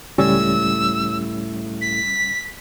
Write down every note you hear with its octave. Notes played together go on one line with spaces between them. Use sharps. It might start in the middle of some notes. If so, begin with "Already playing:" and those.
C#2 A2 G3 C#4 E6
B6